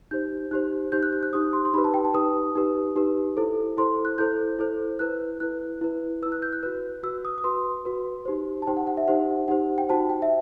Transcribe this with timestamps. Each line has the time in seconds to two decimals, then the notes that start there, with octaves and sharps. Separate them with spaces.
0.11 D#4 G4 C5 G6
0.51 D#4 G4 C5 F#6
0.92 D#4 G4 C5 G6
1.03 F#6
1.13 G6
1.23 F#6
1.33 D#4 G4 C5 D#6
1.53 C6
1.65 C6
1.74 D#4 G4 B4 B5
1.84 A5
1.94 G5
2.04 A5
2.14 D#4 G4 B4 D#6
2.55 D#4 G4 B4
2.96 D#4 G4 B4
3.36 E4 A4 C5
3.77 E4 A4 C5 C6
4.05 F#6
4.18 E4 A4 C5 G6
4.59 E4 A4 C5
4.99 E4 B4 F#6
5.40 E4 B4 F#6
5.81 E4 B4
6.22 E4 B4 E6
6.32 F#6
6.42 G6
6.53 F#6
6.63 F#4 B4 F#6
7.03 F#4 B4 E6
7.25 D#6
7.38 D#6
7.44 F#4 B4 C6
7.85 F#4 B4
8.25 D#4 G4 C5
8.62 A5
8.67 D#4 G4 C5 G5
8.77 F#5
8.87 F#5
8.97 E5
9.08 D#4 G4 C5 F#5
9.48 D#4 G4 C5 F#5
9.78 G5
9.89 D#4 F#4 C5 A5
10.09 G5
10.22 E5